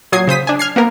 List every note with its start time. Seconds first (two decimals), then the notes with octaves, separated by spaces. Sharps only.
0.12 A#2 F#3 D#6 G#6 C7
0.28 C#3 C5 D#6 B6
0.47 D4 G#5
0.59 F6 G#6 C7
0.76 A#3 B3 A#4